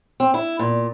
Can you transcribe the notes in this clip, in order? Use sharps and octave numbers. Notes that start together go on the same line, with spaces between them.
C4
E4
A#2